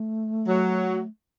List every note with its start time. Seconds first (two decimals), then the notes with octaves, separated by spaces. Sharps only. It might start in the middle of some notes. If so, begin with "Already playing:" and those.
Already playing: A3
0.47 F#3